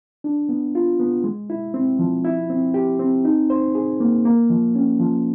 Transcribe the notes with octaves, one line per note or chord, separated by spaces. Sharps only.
D4
B3
F4
B3
G#3
E4
C4
F3
E4
C4
G4
C4
D#4
C5
G#4
A#3
A#3
F3
C#4
F3